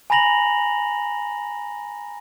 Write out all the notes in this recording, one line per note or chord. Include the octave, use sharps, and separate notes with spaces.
G#5 A#5 B5 A#6 F7 F#7